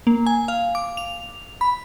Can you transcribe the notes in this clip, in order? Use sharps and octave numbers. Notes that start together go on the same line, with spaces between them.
A#3
G#5
F5
D6
F7
B5